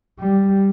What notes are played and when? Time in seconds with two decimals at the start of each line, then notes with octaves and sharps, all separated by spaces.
0.19 G3